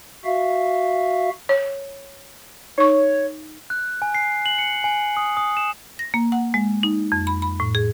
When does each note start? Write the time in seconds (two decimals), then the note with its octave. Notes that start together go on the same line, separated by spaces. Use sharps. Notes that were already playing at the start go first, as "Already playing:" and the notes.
0.25 F#4 E5 F5
1.49 C#5
2.78 D#4 C#5 C#6
3.70 F#6
4.02 G#5
4.15 C7
4.46 F#7
4.58 C#7
4.84 G#5
5.17 D#6
5.37 D#6
5.57 E7
5.99 A#6
6.14 A#3
6.32 F#5
6.54 G#3
6.83 D#4
7.12 F2
7.27 B5
7.42 B5
7.60 A2
7.75 G#4